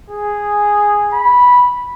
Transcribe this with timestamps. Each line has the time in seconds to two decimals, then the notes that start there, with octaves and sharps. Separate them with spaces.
0.11 G#4
1.13 B5